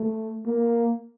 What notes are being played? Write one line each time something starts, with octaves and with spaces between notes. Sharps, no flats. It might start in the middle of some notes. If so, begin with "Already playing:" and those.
Already playing: A3
A#3